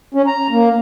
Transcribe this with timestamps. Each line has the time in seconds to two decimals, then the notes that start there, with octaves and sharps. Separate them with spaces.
0.14 C#4
0.27 A#5
0.51 A#3